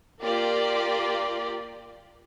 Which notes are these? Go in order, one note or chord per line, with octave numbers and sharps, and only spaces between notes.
A#3 F4 G4 A#4 D5